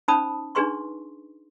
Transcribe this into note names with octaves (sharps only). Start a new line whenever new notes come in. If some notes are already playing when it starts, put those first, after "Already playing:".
C#4 D#4 C5 A5 B5 D#6
D4 D#4 G#4 B4 C6 C#6